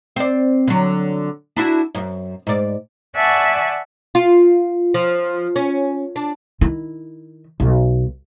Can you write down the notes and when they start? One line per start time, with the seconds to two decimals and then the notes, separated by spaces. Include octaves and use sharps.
0.16 C4 D5
0.68 D3 F#3
1.56 D4 E4 F#4
1.94 F#2
2.47 G#2 D5
3.16 D5 E5 F#5 G#5 A5 C#6
4.15 F4
4.94 F3
5.56 C#4
6.16 D4
6.61 D#3 E4
7.60 B1